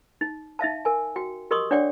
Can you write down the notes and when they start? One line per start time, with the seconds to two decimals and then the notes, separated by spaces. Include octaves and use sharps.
0.21 D#4
0.59 D#4 E5 F5 A5
0.85 A#4 G#5
1.16 F#4 G5
1.51 G4 A#4 D#5 C6 C#6 D#6
1.71 D4 C#5 D5 F#5 G5 D6